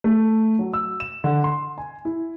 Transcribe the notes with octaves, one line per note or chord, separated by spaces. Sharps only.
A3
F#3
E6
E7
D3
C6
G#5
E4